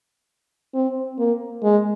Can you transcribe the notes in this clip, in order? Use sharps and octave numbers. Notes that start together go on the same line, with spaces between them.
C4
A#3
G#3